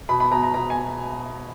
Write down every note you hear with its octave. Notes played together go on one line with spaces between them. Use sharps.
B2 B5
B5
B2 A#5
A#5
B2 A#5
G#5